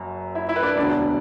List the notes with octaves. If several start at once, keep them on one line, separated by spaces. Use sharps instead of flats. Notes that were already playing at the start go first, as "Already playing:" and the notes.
Already playing: F#1 F#2 F#3
E4 E5
E4 E5
B4
D4 D5
E1 D2 D3 B3 D4 D5